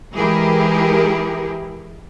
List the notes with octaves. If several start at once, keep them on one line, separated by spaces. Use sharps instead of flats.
E3 G#3 E4 G4 G#4 A#4